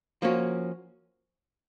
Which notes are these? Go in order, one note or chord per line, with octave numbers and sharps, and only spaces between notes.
F3 A#3 C#4 F#4